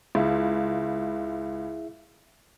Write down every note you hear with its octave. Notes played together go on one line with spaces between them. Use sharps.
C#2 E4 G#4 E5